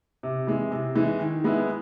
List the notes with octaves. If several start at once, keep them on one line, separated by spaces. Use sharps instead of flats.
C3
E3 G#3
C3
E3 G#3
D#3
G#3 B3 E4